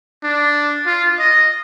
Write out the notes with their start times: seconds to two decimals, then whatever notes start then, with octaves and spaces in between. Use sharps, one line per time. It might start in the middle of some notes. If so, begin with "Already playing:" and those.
0.23 D4
0.86 F4
1.19 D#5